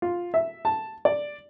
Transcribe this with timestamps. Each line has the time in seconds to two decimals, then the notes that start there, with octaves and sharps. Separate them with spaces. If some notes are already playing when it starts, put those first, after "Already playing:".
0.02 F4
0.34 E5
0.65 A5
1.05 D5